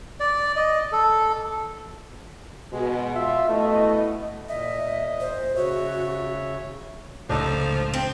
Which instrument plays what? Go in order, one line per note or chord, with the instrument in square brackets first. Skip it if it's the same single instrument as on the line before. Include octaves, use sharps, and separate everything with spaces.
[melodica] D5
D#5
A4
[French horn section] B2 [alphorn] G#3
[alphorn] F4 [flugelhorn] E5
[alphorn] B2 [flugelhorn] A3 [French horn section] E4 D#5
[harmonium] A#2 D#5 [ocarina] E5
[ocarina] C5
[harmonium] C#3 C#5 E5 [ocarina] F#4
[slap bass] C#2 A2 C3 [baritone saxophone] F3 [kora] D4 D#4 A4
[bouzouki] C4